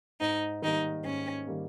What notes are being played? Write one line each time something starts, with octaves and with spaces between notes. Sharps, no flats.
G#2 D#4
D#3 G3 A#3 D#4
G#2 C#4
D#3 G3 A#3